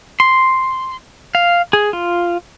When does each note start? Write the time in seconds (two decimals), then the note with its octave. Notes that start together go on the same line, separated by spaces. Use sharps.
0.20 C6
1.35 F5
1.73 G#4
1.93 F4